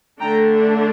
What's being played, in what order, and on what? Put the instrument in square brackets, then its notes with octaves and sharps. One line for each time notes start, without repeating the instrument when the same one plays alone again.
[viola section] D3 A3 D4 G5 A#5